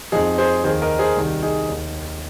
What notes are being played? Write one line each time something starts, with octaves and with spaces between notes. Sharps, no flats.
F2 F3 D#4 G#4
G#4 C5
D#2 D#3 G#4 C5
A#4 D#5
G#4 C5
C2 C3 D#3
D#4 G#4
D#2 D#3